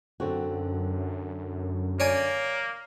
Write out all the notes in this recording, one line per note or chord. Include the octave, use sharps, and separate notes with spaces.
F#2 D3 C4 F#4
A#3 C#5 D5 G#5